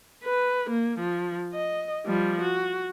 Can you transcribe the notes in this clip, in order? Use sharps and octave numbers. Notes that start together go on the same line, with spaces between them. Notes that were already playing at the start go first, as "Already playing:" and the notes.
B4
A#3
F3
D#5
F3 G3
F#4